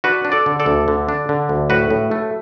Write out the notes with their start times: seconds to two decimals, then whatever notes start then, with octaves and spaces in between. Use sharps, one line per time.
0.04 D4 F#4 B4
0.25 D4
0.32 A4 D5
0.46 D3
0.60 A4 D5
0.66 D2
0.88 D3
1.09 D4
1.29 D3
1.49 D2
1.70 A2 F#4 B4
1.91 A2
2.11 A3